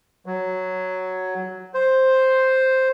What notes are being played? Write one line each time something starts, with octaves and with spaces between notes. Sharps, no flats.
F#3
C5